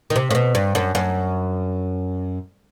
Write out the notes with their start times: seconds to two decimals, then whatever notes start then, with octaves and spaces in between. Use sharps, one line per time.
0.10 D#3
0.16 C3
0.31 A2
0.35 B2
0.55 G2
0.75 F#2
0.95 F#2